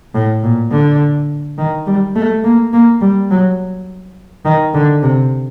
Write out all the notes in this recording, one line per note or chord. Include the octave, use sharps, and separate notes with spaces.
A2
A#2
D3
D#3
G3
A3
A#3
A#3
G3
F#3
D#3
D3
C3